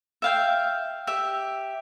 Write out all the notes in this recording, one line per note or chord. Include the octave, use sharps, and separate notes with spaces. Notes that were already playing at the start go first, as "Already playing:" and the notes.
E5 F5 G5
G4 E5